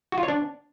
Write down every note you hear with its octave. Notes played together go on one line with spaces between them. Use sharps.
F#4
F4
C#5
D4